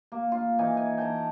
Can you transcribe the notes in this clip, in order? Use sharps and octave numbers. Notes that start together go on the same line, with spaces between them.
A#3
F4
E3 D#4 G#5
G#5
G5 A5 A#5